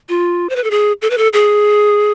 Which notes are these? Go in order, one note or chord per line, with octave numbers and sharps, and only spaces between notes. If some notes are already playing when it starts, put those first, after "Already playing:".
F4
C5
B4
A4
G#4
A4
B4
A4
G#4